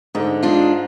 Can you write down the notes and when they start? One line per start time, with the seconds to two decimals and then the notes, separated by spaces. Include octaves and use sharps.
0.15 G#2 D3
0.43 G#3 D4 F4